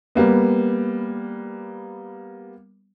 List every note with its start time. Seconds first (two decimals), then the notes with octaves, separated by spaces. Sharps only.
0.15 G3 A#3 B3